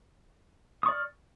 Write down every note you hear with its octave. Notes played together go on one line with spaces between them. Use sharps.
D5 C#6 D#6 F6